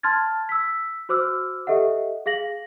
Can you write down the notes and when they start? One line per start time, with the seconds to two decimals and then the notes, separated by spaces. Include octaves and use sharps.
0.03 A5 C6 F6 G#6 A6
0.49 E6 B6
1.09 F#4 C5 D6 E6 F6
1.67 G4 A4 D#5 E5 F#5
2.26 G#4 F5 A#6 F#7